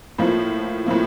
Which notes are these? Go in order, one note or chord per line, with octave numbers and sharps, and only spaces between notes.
A2 F3 A#3
A2 F3 A#3